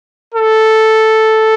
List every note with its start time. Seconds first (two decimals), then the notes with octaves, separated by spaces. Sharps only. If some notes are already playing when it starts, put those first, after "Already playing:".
0.34 A4